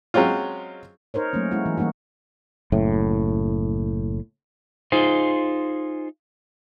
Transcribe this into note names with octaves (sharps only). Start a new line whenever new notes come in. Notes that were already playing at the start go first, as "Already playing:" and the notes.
F#3 G#3 C4 C#4 F4
D#4 A#4 C5 C#5
F#3 A3 A#3 C#4
G#3 C#4 E4 F#4
E3
E3 G3 A#3 D#4 F#4
F#1 A2
D#4 F4 G#4 C5